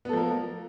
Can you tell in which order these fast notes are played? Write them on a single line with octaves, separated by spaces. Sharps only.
B3 A4 F3 A#4 A#3